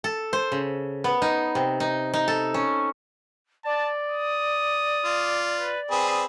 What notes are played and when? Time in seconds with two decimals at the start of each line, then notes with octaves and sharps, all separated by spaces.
0.04 A4
0.33 C5
0.52 C#3
1.04 B3
1.22 D#4
1.55 C3
1.80 D#4
2.14 D#4
2.28 A4
2.54 C#4
3.65 D5 A5
4.09 D#6
5.05 F4
5.59 B4
5.91 C4 G#4 B4 D#6